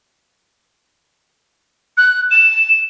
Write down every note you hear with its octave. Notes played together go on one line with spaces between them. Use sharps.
F#6
E7